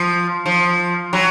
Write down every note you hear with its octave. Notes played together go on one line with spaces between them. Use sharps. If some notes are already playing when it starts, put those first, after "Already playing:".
Already playing: F3
F3
F#3